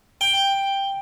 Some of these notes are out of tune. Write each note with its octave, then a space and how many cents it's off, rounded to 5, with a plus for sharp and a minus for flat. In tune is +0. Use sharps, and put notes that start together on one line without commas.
G5 +5